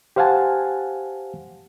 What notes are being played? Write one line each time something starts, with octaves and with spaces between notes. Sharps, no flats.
G4 C5 F5 F#5 G#5 A5